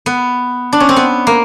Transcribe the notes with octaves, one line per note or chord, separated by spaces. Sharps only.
B3
D4
C#4
C4
B3
A#3